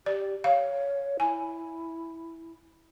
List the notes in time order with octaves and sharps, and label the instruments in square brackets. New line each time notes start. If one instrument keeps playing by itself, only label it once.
[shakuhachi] G4 [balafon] D5
[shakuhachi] C#5 [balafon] F5
[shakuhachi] E4 [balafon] G#5